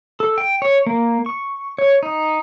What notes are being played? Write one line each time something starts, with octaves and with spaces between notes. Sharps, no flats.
A4
G5
C#5
A#3
C#6
C#5
D#4